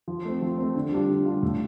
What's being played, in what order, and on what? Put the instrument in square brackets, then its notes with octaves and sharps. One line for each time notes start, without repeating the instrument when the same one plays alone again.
[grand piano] F3
A3 C4
F3
A3 C4
D3
G3 D4 F4
D3
G3 D4 F4
A2